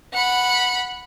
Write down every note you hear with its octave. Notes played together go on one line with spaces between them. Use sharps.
F#5 B5